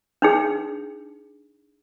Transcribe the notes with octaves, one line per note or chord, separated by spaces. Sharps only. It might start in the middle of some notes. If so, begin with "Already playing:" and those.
D4 D#4 G#4